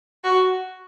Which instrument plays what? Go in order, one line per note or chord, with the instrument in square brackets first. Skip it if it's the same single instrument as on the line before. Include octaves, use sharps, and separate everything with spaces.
[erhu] F#4